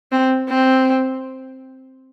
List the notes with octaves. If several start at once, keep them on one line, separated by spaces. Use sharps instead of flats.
C4
C4